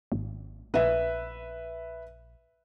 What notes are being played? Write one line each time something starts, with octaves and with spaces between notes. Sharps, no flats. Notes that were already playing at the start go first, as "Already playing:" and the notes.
G#1
A#1 B4 E5